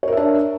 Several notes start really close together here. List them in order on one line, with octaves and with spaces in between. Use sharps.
C#5 A#4 E5 D4